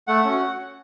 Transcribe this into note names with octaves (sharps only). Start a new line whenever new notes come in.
A3 F#5
C#4 F#4